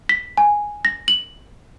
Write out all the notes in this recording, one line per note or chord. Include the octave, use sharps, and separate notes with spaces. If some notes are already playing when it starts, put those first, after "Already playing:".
B6
G#5
A#6
F#7